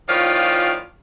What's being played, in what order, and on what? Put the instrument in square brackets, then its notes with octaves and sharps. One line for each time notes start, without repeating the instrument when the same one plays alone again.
[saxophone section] A2 D#3 F3 C#4 F4 D5